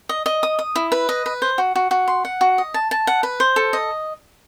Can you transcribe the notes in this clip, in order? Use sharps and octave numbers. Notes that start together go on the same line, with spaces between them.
D#5
D#5
D#6
D#6
E4
B4
D#5
B4
C5
F#4
F#4
F#4
C6
F#5
F#4
D#5
A5
A5
F#5
B4
C5
A4
D#5